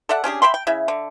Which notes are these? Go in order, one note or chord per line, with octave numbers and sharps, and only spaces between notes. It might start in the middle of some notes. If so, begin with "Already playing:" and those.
A4 D5 E5 F#5
C#4 D4 G4 G#4
E5 G5 B5 C6
G5
C#3 E4 E5
D3